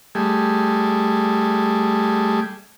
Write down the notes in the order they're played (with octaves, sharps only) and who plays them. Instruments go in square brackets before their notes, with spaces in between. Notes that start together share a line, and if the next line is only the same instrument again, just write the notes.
[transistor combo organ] G3 A3 G#4